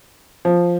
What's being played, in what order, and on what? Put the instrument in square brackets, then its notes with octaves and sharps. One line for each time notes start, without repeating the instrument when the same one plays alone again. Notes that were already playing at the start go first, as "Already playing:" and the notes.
[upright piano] F3